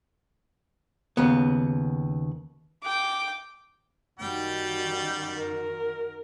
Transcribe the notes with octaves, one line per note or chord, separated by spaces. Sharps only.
D#2 C#3 B3
G5 D6
F#2 D#3 G3 F#4 G5
A#4